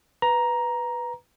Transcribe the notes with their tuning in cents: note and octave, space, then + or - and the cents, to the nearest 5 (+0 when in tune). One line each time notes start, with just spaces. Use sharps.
B4 +0 A#5 +10